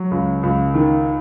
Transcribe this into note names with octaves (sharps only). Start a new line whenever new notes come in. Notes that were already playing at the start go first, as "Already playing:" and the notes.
Already playing: F#3
C#2
C#2
D#3